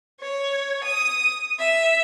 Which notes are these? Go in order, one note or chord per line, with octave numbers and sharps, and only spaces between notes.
C#5
D#6
E5